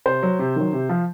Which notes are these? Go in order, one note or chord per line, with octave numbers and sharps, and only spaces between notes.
C3 C5
F#3
C3
D#3 F#3
C3
F3